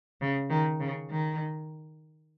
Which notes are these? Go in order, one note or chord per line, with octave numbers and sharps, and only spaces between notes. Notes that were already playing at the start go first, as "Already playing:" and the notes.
C#3
D#3
C#3
D#3